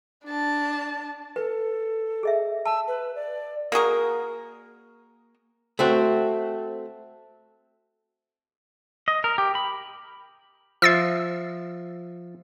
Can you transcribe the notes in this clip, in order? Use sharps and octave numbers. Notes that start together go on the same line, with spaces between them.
D4 A5
A4 B4
G#4 D#5 E5
A5 E6
B4
D5
A#3 F#4 G#4 A#4
A3 C4 F#4
D#5
A#4
G4
B5
F3 E5 E6 A6 C7